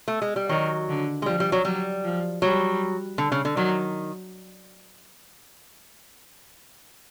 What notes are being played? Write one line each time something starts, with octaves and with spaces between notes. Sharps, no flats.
A3
G#3
G3
D#3 F#3
D3
G#3
F3 G3
G3
F#3
F#3 G3
F3
F#3 G3
D3
C#3
D3
D#3 F#3